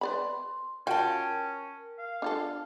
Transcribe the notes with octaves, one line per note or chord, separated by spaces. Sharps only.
B4 D5 B5 C6
C#4 F4 F#4 A#4 G5 A5
F5
D4 F4 A4